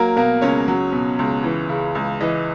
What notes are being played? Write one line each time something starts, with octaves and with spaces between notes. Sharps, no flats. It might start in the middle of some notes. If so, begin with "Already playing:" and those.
Already playing: F#3 A#3 A#4
B2 A#3 A#4
C#2 C#4 C#5
F#3
B2
C#2
E3
C#3
C#2
E3 D#5